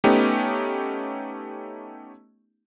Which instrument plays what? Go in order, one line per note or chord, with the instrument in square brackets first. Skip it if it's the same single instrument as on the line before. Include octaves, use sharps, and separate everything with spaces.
[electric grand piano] A3 B3 C#4 D#4 G4